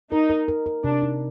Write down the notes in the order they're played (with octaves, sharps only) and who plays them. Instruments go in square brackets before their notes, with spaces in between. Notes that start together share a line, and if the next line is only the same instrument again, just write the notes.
[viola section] D#4 [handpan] A#4
[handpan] A#4
A#4
A#4
[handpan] C3 [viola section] D4
[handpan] D#4